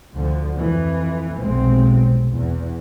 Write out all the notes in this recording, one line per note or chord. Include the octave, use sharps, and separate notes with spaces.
D2 D3 F3
F2 E3
F1 B1 B2 G#3 C4
E2